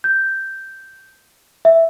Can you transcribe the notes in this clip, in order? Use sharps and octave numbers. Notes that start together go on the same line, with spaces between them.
G6
E5